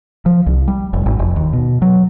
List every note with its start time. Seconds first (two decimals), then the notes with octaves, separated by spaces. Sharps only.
0.26 F3
0.46 C2
0.68 G3
0.93 F1
1.06 G#1
1.19 F1
1.36 D#2
1.53 B2
1.82 F#3